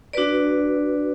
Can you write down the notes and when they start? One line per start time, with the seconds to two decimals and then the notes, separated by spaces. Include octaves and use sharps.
0.13 D4 F#4 B4 D5